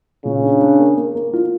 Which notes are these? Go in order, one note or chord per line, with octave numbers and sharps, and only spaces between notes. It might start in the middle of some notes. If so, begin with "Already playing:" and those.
A#2 C#3
D4
D4
A#3
A#3
A#3
F4